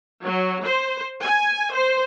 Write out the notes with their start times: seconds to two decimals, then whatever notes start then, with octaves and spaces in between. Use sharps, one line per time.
0.21 F#3
0.64 C5
1.23 G#5
1.73 C5